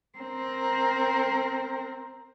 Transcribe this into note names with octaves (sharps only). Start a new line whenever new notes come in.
C4 A#4